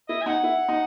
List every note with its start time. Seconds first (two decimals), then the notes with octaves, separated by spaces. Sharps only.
0.09 E4 D#5
0.22 G#5
0.26 D#4 F#5
0.44 E4
0.69 D#4